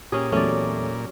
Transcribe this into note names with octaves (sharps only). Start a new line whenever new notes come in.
A#2 C#4 G4 G#4 C#5
E2 F#3 A3 C#4 D5